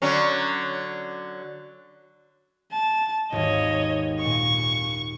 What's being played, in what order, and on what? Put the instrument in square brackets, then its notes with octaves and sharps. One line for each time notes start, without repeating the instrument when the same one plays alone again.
[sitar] D3 F#3 C#4
[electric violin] A5
[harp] G#1 D#2 [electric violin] C#5 D#5
[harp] A#2 C#7 [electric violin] C#6